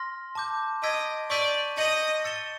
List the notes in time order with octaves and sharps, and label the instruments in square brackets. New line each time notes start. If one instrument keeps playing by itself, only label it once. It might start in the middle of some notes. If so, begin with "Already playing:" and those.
Already playing: [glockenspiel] C6 F6 A#6
A5 D6 G6
[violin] D#5 [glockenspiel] E6 G#6 B6 D7
[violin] D5 [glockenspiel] C#6 E6 G6 B6 D#7
[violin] D#5 [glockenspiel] G6 A#6 C#7 F#7
[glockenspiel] E6 A6 C#7 E7 G7